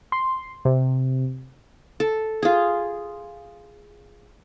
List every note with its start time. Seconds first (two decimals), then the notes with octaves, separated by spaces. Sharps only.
0.12 C6
0.65 C3
2.00 A4
2.43 F4 G#4